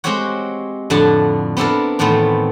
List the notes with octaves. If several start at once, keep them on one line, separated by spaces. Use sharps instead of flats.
G#3 C4 F#4 G4 C#5 F#5
F2 A2 D3 F#5 A5
B3 C4 D4 E4 A4 A#4
E2 A2 D#3 A3 B3 C4